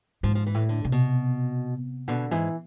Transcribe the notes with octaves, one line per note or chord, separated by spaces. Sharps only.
G#2 F3
F3
E3
A2
D3
C3
B2
B2 D3
G#2 E3